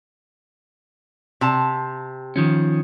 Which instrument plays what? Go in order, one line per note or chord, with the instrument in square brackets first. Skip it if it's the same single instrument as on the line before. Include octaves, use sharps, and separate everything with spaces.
[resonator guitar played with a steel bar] C3 A5
[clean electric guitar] D#3 F3 C#4